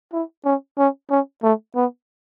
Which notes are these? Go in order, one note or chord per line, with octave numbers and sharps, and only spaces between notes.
E4
C#4
C#4
C#4
A3
B3